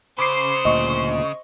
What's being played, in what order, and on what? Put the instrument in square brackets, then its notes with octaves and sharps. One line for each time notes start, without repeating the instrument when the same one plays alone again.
[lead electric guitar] C#3 [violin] C5 [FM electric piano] B5 D6 C7
[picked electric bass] D2 A#2 [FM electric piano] D#5 C#6